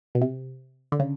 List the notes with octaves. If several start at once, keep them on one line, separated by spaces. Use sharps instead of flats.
B2
C3
D3
C#3